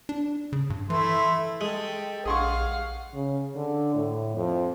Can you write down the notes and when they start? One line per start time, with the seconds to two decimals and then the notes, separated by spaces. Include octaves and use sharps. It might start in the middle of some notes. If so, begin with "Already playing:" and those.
0.09 D4
0.53 C#3
0.70 G2
0.90 E3 A3 E4 C6
1.61 G#3 G4 A4
2.25 A#1 G#4 F5 F#5 C6 C#6
3.14 C#3
3.56 D3
3.95 A2
4.36 F2